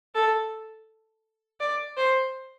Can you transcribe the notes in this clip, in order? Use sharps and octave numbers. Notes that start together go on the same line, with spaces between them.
A4
D5
C5